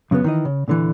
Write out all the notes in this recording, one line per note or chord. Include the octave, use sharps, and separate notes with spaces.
F#2 C#3 F#3 B3
D#3 E3 D#5
C#3
A#2 D3 E3